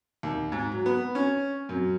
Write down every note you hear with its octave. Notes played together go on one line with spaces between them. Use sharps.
D#2
G#2
F#3
B3
C#4
F#2